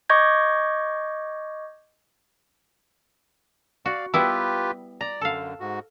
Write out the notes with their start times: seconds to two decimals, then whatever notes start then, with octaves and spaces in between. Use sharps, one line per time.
0.10 D#5 C#6 D6 G6 G#6 A#6
3.86 F#4 D5 F5
4.14 G3 B3 E4 F4 G4 B4
5.01 D5 A#5
5.21 F#2 D3 A4 F5
5.60 G#2 F#4